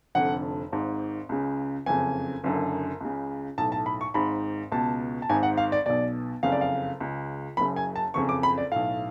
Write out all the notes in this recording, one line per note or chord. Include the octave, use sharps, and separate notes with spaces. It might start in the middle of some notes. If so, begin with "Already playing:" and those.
F1 F2 D3 F#5
G#1 G#2
C#2 C#3
F#1 F2 C#3 G#5
F#1 F#2 D3
C#2 C#3
B1 A2 A5
A5
B5
C#6
G#1 G#2 B5
C#2 B2 A5
A5
G#1 G#2 G#5
F#5
F5
D5
B1 B2 D5
F#1 F2 C#3 F5
D5
F5
C#2 C#3
F#1 F#2 C#3 B5
G#5
A5
F#1 F2 C#3 C#6
D6
B5
D5
B1 A2 F5